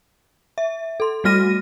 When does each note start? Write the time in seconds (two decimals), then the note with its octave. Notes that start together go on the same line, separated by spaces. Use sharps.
0.58 E5
1.00 A4 C6
1.24 G3 A3 F#4 F6 A#6 D#7